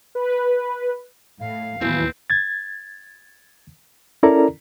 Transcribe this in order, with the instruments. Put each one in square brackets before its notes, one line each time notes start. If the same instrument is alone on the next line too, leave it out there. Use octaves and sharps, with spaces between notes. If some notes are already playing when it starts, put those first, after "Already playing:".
[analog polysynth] B4
[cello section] A2 [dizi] F5
[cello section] D#2 B3 B4 [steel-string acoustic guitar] A2 E3 F#3 [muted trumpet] C4
[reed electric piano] G#6 A6
C#4 E4 A4 A#4 D5 A#5